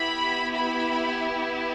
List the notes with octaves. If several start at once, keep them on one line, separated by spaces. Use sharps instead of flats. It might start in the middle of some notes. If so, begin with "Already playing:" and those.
Already playing: B3 E4 G4 B5
B5